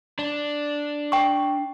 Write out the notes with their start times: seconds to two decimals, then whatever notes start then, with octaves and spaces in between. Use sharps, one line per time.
0.19 D4
1.12 G5 C#6